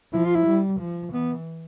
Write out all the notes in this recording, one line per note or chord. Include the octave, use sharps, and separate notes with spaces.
F3 E4
F4
E4
G3
F3
E3 B3